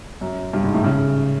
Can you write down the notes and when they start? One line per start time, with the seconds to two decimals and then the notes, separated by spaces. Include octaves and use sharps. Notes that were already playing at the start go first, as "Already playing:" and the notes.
0.21 F#2
0.53 G2
0.64 G#2
0.74 A2
0.84 C#3